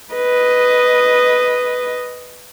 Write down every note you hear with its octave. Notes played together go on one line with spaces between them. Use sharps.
B4 D#5